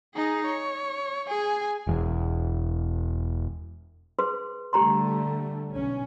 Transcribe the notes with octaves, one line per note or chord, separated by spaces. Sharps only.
D#4 G#4
C#5
G#4 G#5
E1 E2
G#4 B4 C6
D3 G3 A3 G4 A#5 C6
B1 C#4